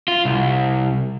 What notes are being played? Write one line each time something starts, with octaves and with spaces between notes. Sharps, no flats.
F4
C2